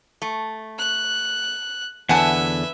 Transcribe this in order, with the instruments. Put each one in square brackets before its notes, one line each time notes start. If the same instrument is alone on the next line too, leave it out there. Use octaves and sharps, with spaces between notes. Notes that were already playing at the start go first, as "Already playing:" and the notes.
[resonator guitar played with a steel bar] A3
[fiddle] F#6
[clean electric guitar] E2 D3 [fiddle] B4 E5 [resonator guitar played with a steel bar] F#5 G#5 A5